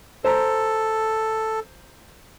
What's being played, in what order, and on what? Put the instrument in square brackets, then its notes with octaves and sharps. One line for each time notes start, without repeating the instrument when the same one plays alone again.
[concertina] A4 [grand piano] C5 A#5